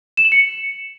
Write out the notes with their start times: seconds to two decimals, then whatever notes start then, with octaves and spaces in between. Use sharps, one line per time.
0.17 E7
0.25 F#7
0.32 C#7